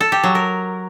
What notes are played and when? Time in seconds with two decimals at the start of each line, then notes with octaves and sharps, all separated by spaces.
0.01 A4
0.12 G4
0.24 F#3
0.35 A#4